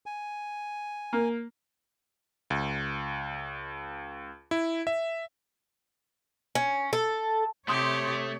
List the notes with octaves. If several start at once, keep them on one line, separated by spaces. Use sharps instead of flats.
G#5
A#3
C#2
E4
E5
C#4
A4
C3 A3 G4 C#5 C6 D#6 G6